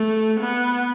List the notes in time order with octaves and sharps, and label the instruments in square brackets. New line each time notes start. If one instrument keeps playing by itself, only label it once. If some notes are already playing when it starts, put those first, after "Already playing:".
Already playing: [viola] A3
B3